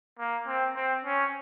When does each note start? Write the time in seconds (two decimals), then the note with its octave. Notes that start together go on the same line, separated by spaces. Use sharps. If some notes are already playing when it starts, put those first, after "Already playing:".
0.19 A#3
0.47 C4
0.76 C4
1.05 C#4